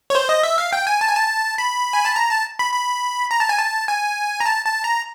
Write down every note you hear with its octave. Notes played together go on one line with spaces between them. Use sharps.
C#5
C5
D#5
E5
F5
G5
G#5
A5
G#5
A5
B5
G#5
A5
A#5
A5
B5
B5
A#5
A5
G#5
A5
G#5
A#5
A5
A5
A#5